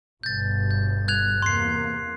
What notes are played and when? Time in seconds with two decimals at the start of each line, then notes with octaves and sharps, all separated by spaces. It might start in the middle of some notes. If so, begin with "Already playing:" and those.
0.23 G1 G2 B2 G6 A6
0.71 G6
1.08 F#6 G#6 F7
1.42 E2 C3 A#3 C6 C7